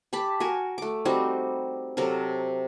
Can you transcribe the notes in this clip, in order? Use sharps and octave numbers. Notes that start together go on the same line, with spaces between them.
G4 A5 B5
F#4 A#4 G#5
A3 D6
G3 C4 D#4 F#4
C3 F#3 A4 A#4